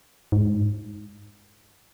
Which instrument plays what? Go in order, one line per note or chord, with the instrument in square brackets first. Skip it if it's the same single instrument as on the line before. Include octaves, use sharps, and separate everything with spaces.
[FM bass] G#2